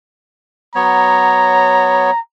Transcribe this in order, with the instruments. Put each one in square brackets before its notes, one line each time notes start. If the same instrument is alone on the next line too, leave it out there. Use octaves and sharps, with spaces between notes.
[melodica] F#3 B3 C#5 [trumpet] A#5